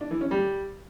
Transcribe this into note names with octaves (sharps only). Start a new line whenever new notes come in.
D4
E3
C#4
G3